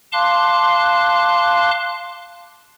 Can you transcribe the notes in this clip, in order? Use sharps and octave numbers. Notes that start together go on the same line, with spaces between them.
F5 A5 C6 D6 F#6